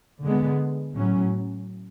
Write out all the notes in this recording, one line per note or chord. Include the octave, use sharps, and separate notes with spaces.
D3 G#3 B3
A2 F#3 C#4